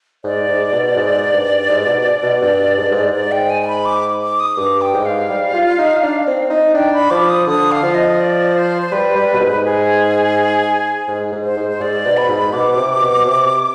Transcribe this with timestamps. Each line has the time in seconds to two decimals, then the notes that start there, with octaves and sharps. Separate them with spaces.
0.24 G#2 D5
0.48 G#2
0.73 B2
0.96 G#2
1.33 G2
1.69 G#2
1.87 B2
2.23 B2
2.41 G2
2.78 G#2
2.85 G2
2.92 G#2
3.13 G#2 D5
3.32 G5
3.50 G#5
3.62 G#5
3.68 B5
3.85 D6
4.22 D6
4.40 D#6
4.57 G2 D6
4.81 G5
4.93 G#2
5.05 F5
5.30 G3
5.54 F4
5.78 D#4
6.03 D4
6.27 C4
6.50 D#4
6.74 D4 G5
6.93 B5
7.10 F3 D6
7.29 D#6
7.47 D3 D#6
7.71 F5
7.83 F3
7.95 D#5
8.20 D5
8.55 C5
8.82 C5
8.92 G3 B4
9.16 G3
9.33 B2
9.40 G#2
9.64 G#4
11.08 G#2
11.32 G#2
11.45 C5
11.57 G#2
11.70 C5
11.81 G#2 D5
12.06 B2
12.17 B5
12.29 G#2
12.53 B2 D6
12.77 C3
13.01 B2
13.26 C3